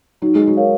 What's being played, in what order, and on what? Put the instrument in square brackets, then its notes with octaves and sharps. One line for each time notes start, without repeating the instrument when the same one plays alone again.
[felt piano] F#3 [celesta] D#4
[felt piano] G#3
F#3
[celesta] A#4 C#5 F5